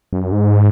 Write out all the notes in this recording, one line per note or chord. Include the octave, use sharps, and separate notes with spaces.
F#2
G#2